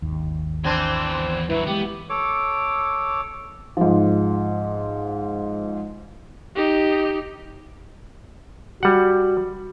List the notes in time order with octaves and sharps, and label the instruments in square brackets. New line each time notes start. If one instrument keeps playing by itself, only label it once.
[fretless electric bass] G#1 D#2
[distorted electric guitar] E2 C6 [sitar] E3 C4 D4
[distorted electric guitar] G2 F#3 [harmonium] E4 B4
[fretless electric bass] E3 G#3 [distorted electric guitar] B3 [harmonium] G4
[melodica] A4 C#5 D6
[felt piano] G#2 F3
[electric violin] D#4 G4
[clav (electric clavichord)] G3 F#5 [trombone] F#4